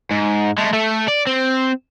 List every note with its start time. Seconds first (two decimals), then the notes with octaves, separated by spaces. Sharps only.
0.11 G#2
0.58 G#3 A3
0.73 A3
1.08 D5
1.27 C4